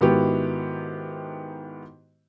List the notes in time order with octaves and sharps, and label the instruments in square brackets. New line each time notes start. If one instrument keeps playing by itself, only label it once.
[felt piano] G#2 D#3 B3 E4 F#4 G4